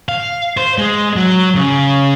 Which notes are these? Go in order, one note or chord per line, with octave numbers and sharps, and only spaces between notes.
F5
C5
G#3
F#3
C#3